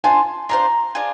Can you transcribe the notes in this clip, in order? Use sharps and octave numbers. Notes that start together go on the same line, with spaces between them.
D4 F4 C5 G#5
D4 F4 C5 A#5
D4 F4 G#4